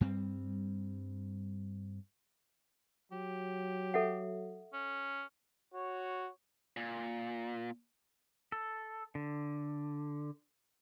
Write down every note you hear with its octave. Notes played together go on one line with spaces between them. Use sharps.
G2 G3 C4
F#3 G4
A4 E5 F#5
C#4
F#4 C#5
A#2
A4
D3